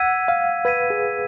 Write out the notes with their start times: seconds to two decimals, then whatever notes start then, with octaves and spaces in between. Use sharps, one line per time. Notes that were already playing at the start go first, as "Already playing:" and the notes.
Already playing: F#5 E6 G#6 B6 D#7
0.28 F5
0.65 B4 E6 G#6 B6 D#7
0.90 G#4